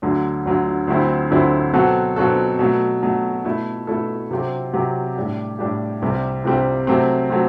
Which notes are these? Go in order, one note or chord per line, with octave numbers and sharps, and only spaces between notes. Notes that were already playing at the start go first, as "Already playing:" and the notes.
D2 D3 F#3
D2 D3 F#3
D2 D3 F#3 C4 E4
D2 D3 F#3 C4 E4
B2 F#3 C4 F#4 A4
B2 F#3 C4 F#4 A4
B2 F#3 A3
B2 F#3 A3
B2 A3 E4 A4
B2 A3 E4 A4
C3 F#3 C4 G4
C3 F#3 C4 G4
A2 G3 D4 G4
A2 G3 D4 G4
C2 C3 G3 C4 G4
C2 C3 G3 C4 G4
C3 F#3 A3 C4
F#3 A3 C4